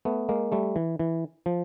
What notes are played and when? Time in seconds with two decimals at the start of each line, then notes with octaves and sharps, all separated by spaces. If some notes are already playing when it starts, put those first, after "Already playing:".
0.05 A3 B3
0.29 G#3 A#3
0.52 G3 A3
0.76 E3
1.00 E3
1.46 F3